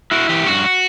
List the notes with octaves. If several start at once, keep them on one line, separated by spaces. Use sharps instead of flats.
E4 F#4
E3 G4
G2 F#4